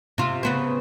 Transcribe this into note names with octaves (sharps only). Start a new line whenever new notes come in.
C3 F4
C#3 B3 C4